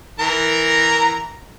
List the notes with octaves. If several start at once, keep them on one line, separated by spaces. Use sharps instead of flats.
E3 A#4 A#5